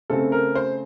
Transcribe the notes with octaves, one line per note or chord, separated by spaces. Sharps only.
C#3 A3 C4 A4
A#4
C5